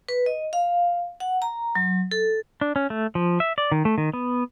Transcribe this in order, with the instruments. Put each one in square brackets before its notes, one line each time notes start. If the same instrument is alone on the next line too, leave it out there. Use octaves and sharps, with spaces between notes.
[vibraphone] B4
D#5
F5
F#5
A#5
F#3
A4
[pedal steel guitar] D4
C#4
A3
F3
E5
D5
D#3
A3
D#3
B3